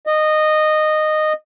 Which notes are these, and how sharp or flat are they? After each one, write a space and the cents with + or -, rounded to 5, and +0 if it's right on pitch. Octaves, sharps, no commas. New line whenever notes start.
D#5 -15